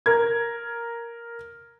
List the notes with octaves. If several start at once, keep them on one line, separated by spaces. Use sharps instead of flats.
A#4 G#6